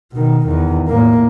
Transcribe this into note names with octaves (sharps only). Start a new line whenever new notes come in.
B2 D#3
E2 D#3
A2 A#3